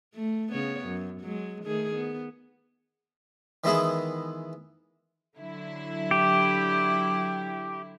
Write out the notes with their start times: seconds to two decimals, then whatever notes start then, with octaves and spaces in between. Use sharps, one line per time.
0.15 A3
0.51 C#3 B3 C#5
0.86 F#2
1.21 F#3 G#3
1.64 D#3 A3 G#4
1.94 B3
3.64 D#3 E3 G#3 B3 E4 G#4
5.38 D3 F#3 E4
6.11 G4